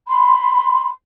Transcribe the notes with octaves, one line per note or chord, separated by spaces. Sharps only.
B5 C6